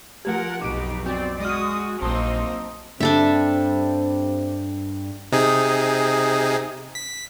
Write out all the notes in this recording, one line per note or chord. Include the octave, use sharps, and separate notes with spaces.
F3 A3 F4 G4 A#4 F#5
B1 F2 B2 D#4 G4 D6 D7
C4 F#4 D5
G#3 F#4 D#6 F6 A#6
A#1 F#3 A#3 C4 D#4 A5 D#6
G2 G3 C4 D4 A4 E5
C3 D#4 G#4
B6